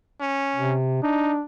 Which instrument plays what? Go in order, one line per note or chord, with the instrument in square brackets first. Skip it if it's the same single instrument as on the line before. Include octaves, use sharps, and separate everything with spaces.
[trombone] C#4
[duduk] C3
[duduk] D4 [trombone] D#4